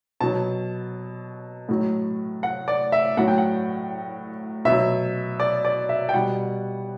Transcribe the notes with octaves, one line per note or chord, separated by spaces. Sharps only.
B2 F#3 A5
A2 F#3
F#5
D5
E5
A2 F#3 F#5
G5
F#5
B2 F#3 E5
D5
D5
E5
G5
B2 G3 F#5